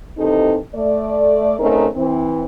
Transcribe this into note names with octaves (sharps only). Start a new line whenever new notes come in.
D#2 C3 E3 C4 D#4 A4
A3 D5
C#3 A3 C4 D#4 G#4 A#4
E3 C4